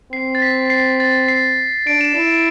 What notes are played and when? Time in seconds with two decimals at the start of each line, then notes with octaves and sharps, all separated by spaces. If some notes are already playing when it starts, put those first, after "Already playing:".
0.12 C4 C7
0.35 A6
0.42 B6
0.70 C7
1.00 A6
1.28 C7
1.87 D4 D7
2.01 E7
2.15 E4 E7
2.30 E7